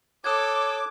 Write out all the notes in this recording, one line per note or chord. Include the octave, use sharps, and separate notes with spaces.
A4 C#5 D6 D#6 F#6 G#6